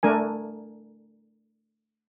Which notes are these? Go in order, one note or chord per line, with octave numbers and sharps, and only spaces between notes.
A3 D4 A#4 G#5